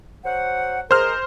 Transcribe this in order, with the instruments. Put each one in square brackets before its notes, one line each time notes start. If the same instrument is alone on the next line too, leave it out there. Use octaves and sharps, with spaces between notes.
[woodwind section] F#3 C5 F#5
[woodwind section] G#3 G#4 A#4 [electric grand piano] C5 F6